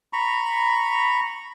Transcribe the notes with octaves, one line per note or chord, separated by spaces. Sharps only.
A#5 B5 C#6